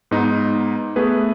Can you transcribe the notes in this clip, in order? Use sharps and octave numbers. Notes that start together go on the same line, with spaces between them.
G#2 B3 D#4
A3 B3 G#4 B4